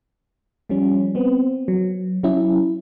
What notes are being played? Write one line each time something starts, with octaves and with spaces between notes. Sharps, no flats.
F3 G3 C#4
B3 C4
F#3
F#3 C#4 E4